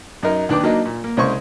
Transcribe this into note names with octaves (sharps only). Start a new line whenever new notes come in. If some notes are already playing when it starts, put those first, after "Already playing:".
F#2 D#4 A#4
D#2 D4 B4 G5 D6
F#3 A#3 D4 D#4
A#2
A#3
C2 C#3 G#3 C5 C6 C#6